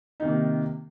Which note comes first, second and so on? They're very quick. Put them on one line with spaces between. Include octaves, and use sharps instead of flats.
D#4 D#3 C3 A#3